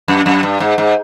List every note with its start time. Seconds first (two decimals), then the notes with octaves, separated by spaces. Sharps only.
0.08 F#2
0.26 F#2
0.43 G2
0.60 G#2
0.78 G#2